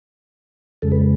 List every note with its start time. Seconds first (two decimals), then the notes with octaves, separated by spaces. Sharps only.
0.82 F2 C#3 G#3 A4
0.92 B4